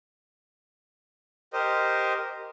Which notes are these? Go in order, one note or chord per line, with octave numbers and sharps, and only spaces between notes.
G4 A#4 C5 D#5